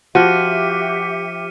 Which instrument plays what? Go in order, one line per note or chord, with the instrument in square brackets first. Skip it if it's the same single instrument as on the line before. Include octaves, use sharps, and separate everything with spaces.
[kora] F3 [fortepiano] F#4 [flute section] G4 E5 [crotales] F6 C#7 D#7